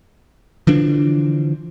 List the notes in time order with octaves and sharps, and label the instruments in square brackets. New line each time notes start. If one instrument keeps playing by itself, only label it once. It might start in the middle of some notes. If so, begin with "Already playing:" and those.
[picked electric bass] D3 E3 F3 D4